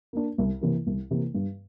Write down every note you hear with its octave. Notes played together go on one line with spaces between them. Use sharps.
A#3 D4
C2
C3 E3 A#3
C2
C3 E3 A#3
G2